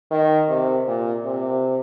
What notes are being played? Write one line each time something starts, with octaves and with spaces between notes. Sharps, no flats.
D#3
C3
A#2
C3